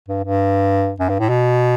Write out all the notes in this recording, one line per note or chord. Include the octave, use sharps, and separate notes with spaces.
G2
G2
F#2
G2
A2
B2